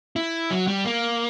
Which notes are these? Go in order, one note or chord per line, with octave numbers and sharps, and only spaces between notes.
E4
F#3
G3
A#3